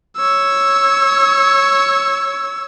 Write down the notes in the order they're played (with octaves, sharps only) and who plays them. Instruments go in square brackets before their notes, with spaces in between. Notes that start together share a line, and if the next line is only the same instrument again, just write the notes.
[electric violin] C#5 E6